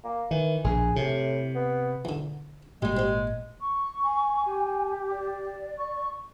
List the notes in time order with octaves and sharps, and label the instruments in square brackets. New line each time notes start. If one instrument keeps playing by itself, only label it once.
[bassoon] A#3
[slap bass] D#3 [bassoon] E3
[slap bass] A#1 [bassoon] G#4
[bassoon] A2 [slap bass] C3
[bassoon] B3
[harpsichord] E2 D3
[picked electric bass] G#1 A#2 A#3 [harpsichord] G3 G4 [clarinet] G#3
[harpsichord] C4 G4
[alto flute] C#6
[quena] G#5
[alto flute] G4
[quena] D5
[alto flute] C#6